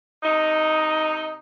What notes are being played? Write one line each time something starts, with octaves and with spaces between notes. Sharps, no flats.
C3 D#4